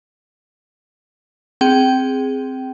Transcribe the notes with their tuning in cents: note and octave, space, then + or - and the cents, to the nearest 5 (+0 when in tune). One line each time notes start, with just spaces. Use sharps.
C4 +0 G#4 +0 G5 -25